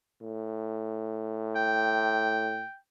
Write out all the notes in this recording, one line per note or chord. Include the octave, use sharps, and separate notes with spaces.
A2
G5